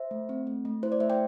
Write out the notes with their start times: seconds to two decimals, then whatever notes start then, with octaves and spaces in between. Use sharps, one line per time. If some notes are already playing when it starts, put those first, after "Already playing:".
Already playing: C5 E5
0.11 A3
0.29 C4
0.47 A3
0.65 A3
0.83 E4 C5
0.92 D5
1.00 A3 C5 E5
1.10 D5 G5